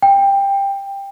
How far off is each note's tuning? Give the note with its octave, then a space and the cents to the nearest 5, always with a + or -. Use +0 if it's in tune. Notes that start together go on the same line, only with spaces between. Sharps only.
G5 +15